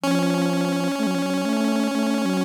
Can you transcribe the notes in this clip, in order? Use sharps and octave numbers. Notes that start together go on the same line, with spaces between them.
F3 C#4
A3
F#3
F3
F#3
A3
A3
F#3